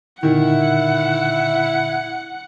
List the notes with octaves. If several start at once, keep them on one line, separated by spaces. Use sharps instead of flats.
A#2 D3 D#3 E4 F#5